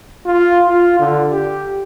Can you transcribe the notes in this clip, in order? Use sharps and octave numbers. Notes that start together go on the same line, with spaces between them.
F4
F4
D3
G4